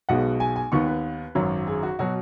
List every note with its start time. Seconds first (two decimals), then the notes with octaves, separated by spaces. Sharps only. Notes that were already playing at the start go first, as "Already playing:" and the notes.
0.09 B1 B2 G#3 B3 F#5
0.40 G#5
0.56 G#5
0.72 D#2 D#3 B3 C#6
0.87 B4
1.35 G#1 F#2 F#3
1.67 G#4
1.83 F#4
1.99 B2 F#3 F#4